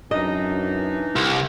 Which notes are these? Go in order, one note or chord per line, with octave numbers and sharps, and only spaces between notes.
F#2 E3 D4 D#4 D#5
C2